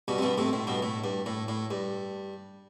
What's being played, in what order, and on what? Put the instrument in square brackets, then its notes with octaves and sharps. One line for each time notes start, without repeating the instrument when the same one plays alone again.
[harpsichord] G2 B2
C3
G2 B2
A2 C3
A2
G2 B2
A2
G2
A2
A2
G2